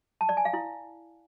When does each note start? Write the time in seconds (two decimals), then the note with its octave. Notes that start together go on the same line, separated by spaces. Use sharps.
0.21 A5
0.29 D5
0.37 G#5
0.45 F5
0.53 E4